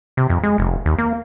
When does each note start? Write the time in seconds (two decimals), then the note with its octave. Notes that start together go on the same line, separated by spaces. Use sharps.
0.17 C3
0.30 F2
0.43 G#3
0.58 F1
0.85 D#2
0.98 A#3